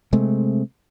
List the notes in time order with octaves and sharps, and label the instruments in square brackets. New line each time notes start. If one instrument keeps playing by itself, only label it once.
[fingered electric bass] C3 G#3 A3 C4